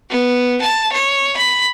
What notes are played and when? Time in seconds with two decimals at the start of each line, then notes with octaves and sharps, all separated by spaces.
0.10 B3
0.62 A5
0.93 C#5
1.37 B5